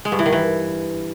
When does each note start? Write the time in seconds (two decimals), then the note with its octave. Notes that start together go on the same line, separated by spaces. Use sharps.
0.05 G#3
0.12 G2
0.19 E3
0.26 D#3
0.33 E3